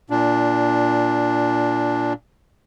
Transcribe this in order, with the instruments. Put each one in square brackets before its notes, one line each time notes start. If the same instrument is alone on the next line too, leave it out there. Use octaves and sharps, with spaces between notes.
[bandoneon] A#2 D4